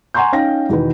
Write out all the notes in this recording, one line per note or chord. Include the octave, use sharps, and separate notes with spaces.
F#5 G#5 A#5 C6 C#6 G6
C#4 D#4 F5 G5 A#6
E2 B2 D#3 B4